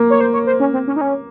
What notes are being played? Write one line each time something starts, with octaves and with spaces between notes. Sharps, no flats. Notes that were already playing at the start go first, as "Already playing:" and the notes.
Already playing: A#3
C#5
C5
C#5
C5
C#4
C4
C#4
D#4
C#4